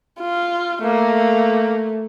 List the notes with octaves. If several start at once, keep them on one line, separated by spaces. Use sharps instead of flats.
F4
A3 A#3